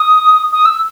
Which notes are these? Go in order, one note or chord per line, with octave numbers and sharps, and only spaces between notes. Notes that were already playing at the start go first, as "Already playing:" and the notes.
Already playing: D#6
D#6
E6